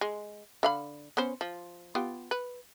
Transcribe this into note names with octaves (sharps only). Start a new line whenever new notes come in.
G#3
D3 F5 B5
B3 C#4 C5
F3
B3 F4 G4
B4